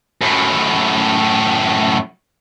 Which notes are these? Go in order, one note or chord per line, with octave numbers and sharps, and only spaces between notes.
F#2 A2